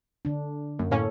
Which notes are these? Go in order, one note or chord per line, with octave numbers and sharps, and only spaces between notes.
D3 D4
F#2 A#3
A2 A#3 C#4 A4 C#5